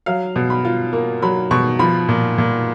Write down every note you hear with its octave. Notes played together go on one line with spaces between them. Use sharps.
F#3 F5
B2
B5
F4
A#3
F#3 B5
B2 C#6
F3 B5
A#2
A#2